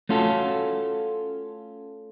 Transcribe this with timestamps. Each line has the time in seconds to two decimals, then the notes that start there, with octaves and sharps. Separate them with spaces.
0.09 A3 C#4 F4 F#4 A4